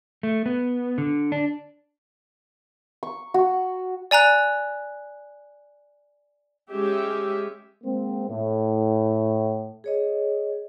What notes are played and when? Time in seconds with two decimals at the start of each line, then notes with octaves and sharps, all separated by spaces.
0.23 A3
0.46 B3
0.98 D3
1.32 D4
3.03 C#6
3.34 F#4
4.11 D5 G#5 A#5 F#6
6.73 G#3 C#4 G4 E5
7.84 G#3 A#3 C4
8.29 A2
9.84 G#4 C#5 D#5